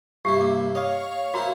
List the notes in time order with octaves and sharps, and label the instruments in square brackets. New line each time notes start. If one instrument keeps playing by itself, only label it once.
[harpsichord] G2 C3 E4 [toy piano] G4
[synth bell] A#3 [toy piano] D6
[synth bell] C#5 F5 C#6 [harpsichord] D#5
[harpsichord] A#3 C4 E4 [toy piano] F#4 A#5